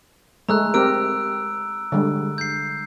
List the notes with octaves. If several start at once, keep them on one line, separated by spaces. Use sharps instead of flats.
G#3 A3 A#5 E6 F#6
C4 G4 A#4 E6 D7
D3 G3 G#3
G6 C7